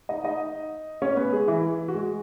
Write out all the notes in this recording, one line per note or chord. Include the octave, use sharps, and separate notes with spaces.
D#4 D#5
D#4 D#5
C#4 C#5
B3 B4
G#3 G#4
E3 E4
F#4
G#3 G#4